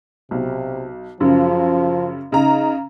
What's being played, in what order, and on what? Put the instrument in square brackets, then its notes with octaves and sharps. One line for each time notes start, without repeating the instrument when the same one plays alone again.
[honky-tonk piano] B1 [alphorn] C3
[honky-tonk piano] F#2 C#3 [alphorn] F3
[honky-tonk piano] C#3 A#5 [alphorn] D#4